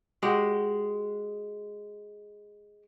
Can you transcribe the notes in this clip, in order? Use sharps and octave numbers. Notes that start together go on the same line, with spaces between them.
G#3 F#4 G4